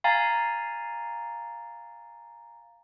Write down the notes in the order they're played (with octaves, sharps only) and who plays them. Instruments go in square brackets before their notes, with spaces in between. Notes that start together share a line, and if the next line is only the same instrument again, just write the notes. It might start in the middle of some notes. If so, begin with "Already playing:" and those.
[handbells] F5 G#5 A#5 A6